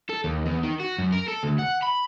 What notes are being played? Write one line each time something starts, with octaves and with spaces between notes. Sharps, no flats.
A4
D#2
E2
D#3
F#4
F#2
A#4
A4
D2
F#5
B5